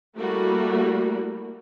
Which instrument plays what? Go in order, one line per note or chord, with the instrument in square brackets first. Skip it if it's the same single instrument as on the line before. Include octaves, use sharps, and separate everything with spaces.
[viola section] G3 A3 A#3 E4 F#4